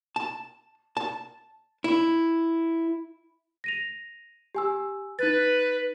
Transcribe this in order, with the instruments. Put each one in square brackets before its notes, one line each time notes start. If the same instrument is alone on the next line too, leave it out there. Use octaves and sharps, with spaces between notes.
[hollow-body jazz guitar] A5
A5
E4
[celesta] A#6 D#7 F7
G4 G#5 E6
[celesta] D#4 A6 [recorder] B4